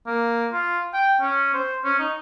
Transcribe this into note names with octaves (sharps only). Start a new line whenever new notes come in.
A#3
F4
G5
C#4
C5
C#4
D#4